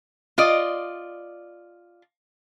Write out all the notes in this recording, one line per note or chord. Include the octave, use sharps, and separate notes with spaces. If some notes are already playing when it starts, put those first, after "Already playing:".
F4 D5 D#5